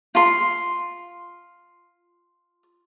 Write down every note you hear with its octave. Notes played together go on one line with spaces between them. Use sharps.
F4 C6